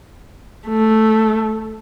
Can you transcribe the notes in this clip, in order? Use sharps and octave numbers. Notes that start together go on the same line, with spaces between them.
A3